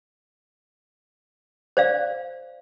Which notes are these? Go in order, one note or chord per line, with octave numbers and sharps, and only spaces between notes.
C5 D5 F5